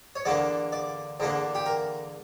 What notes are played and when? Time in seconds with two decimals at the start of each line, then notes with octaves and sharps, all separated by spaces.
0.16 C#5
0.25 E2 D3 A#3 D4 D5
0.72 D5
1.20 E2 D3 A#3 D4
1.55 G4
1.66 A#4